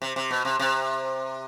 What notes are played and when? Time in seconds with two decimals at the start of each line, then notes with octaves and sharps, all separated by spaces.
0.02 C3
0.16 C3
0.31 B2
0.45 C3
0.59 C3